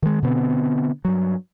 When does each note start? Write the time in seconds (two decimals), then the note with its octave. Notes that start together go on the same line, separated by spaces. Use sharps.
0.02 D#3 G#3
0.22 B2 D3 B3 C4
1.05 G2 F#3